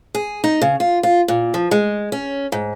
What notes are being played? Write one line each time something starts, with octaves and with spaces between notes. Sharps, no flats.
G#4
D#4
C#3
F4
F4
A#2
F3
G#3
C#4
G#2